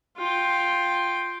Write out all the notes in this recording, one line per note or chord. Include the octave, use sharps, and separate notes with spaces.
F4 G5